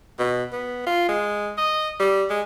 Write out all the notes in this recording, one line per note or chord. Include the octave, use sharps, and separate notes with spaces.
B2
B3
F4
G#3
D#5
G3
G#3